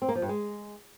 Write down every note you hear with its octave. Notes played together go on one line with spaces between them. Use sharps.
C4
A#3
F3
G2
G#3